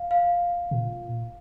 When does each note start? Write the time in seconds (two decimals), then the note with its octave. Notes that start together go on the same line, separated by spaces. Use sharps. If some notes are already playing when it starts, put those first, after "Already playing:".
Already playing: F5
0.11 F5
0.71 A#2